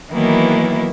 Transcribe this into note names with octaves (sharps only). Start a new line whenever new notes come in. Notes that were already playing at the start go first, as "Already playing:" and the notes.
D#3 E3 F#3 A#3 B3 E4